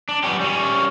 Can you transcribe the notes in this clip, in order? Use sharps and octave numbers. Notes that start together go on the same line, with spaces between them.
D4
F#3 G3 B3 C#4 G4
G3 C#4